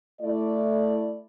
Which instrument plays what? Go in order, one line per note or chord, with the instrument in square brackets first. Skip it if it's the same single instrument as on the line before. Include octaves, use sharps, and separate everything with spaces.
[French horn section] A3 E4 D5